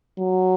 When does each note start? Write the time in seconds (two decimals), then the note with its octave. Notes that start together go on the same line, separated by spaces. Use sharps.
0.19 F#3